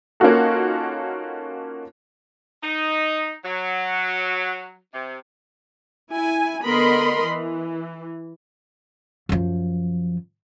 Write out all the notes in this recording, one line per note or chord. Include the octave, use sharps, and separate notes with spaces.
A#3 C#4 D#4 F4 F#4 A4
D#4
F#3
C3
E4 G#5
D3 B3 A#4 D#5 B5 C6
E3
F#2 F3